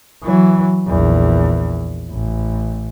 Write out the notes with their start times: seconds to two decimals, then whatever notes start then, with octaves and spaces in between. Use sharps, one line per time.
0.23 E3 F#3
0.88 A#1 E2
2.11 A1